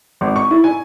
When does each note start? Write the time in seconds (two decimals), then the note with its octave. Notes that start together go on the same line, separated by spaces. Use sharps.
0.21 G#1
0.36 C#6
0.51 E4
0.64 G#5